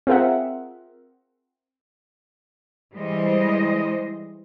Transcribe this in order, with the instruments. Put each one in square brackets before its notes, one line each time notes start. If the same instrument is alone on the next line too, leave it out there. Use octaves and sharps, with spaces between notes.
[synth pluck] C4 F4 G#4 A#4 E5 F#5
[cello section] E3 G3 G#3 C5 D#5